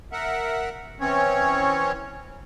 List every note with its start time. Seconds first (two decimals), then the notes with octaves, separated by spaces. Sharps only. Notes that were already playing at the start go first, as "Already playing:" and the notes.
0.12 A#4 E5 F#5
1.00 E3 C4 C#4 C#5